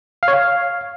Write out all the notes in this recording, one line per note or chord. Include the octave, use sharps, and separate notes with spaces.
F5
C#5
F5